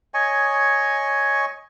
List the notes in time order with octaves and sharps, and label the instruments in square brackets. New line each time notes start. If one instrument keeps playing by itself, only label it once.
[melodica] C#5 D#5 G#5 C#6